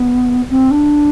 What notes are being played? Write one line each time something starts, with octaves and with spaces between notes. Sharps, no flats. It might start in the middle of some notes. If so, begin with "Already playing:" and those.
Already playing: B3
C4
D4